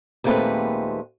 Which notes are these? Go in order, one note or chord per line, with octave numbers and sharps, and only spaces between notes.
D#2 A#2 G#3 A3 C4 B4